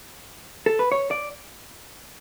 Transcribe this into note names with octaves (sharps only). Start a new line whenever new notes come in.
A4
B4
C#5
D5